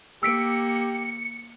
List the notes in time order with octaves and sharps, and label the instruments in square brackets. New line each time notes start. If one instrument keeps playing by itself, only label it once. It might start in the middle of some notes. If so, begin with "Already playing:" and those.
[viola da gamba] A#3 [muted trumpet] G4 [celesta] E6 B6 D7 [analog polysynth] C#7